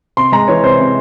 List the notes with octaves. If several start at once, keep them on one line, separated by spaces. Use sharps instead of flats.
C3 C6
G#3 A#5
E3 C#5
C3 C5
C3